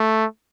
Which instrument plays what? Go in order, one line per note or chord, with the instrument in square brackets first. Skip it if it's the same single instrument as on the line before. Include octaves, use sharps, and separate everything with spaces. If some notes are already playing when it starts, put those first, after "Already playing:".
Already playing: [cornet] A3